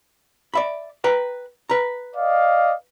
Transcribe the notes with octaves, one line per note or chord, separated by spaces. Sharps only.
D5 E5 B5
B4 G5 A#5
B4 A#5
D5 D#5 F5